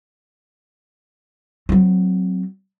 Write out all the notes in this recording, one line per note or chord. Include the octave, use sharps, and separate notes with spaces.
F#3 C4